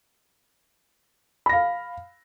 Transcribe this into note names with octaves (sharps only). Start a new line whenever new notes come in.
F5 B5 A#6